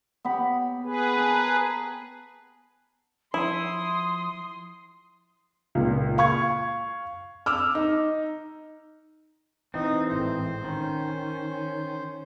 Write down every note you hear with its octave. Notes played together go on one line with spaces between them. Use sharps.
B3 G4 B5
G#4 B4
A#4 A5
F3 E4 C6 D#6
C#2 A#2
F5 C#6 G#6
D6 E6 F6
D#4
E3 C4 D#4
G#1 A2 C5
D#3 C#4